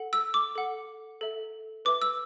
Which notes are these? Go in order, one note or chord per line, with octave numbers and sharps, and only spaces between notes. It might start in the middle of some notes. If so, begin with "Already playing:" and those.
Already playing: A4 F#5
E6
D6
A4 F#5
A4 E5
B4 E5 D6
E6